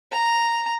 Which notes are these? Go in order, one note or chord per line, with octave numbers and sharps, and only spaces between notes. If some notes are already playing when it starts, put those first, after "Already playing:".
A#5